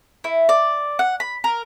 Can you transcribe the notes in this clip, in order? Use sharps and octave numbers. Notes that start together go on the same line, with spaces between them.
E4
D5
F#5
B5
A#4